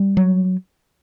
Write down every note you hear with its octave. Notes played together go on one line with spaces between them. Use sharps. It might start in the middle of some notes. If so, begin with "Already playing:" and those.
Already playing: G3
F#3